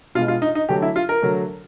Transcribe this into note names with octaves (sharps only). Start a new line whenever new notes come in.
B2 G#3 F4
F4
D#4
D#4
D3 F#3 A3 G4
E4
F4
A#4
D3 F#3 A3